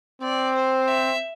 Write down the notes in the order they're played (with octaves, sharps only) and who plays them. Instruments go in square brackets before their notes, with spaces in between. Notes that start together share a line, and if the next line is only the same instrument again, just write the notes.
[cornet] C4 [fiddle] D5
[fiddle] C5
E5